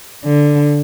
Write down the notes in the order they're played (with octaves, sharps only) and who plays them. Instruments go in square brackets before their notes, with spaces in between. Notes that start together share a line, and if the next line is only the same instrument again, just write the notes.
[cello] D3